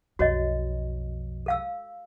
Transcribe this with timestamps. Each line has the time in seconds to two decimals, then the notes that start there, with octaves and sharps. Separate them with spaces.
0.19 B1 F2 F#4 C#5 D#5
1.46 A4 F5 E6